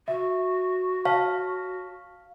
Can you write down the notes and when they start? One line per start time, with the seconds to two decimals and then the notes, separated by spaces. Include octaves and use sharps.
0.08 F#4 E5
1.05 C#5 F5 A5